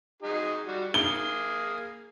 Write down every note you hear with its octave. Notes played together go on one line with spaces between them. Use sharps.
D#4 F#4 G#4
G3 F#4
A#3 G#4 G7